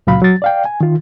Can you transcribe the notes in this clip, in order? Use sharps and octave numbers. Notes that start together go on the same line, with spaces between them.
C#2 A#2 F#3 F5 B5
F#3 A6
D5 F5 G5
G#5
D#3 F4